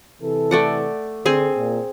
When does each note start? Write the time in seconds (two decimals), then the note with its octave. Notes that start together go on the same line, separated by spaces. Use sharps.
0.21 C3 E3 A4
0.51 A3 D5 F#5
1.26 D3 C4 G#4 C6
1.55 A#2